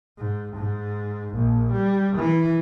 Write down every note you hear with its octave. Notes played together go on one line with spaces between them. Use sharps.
G#2
G#2
A#1
G3
E3